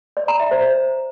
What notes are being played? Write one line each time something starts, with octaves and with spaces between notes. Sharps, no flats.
D5
A#5
E5
C5